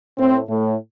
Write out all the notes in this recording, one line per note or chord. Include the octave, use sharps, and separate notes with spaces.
A2 C4
A2